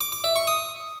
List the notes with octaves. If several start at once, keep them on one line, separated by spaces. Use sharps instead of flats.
D6
D6
E5
C#6
D#6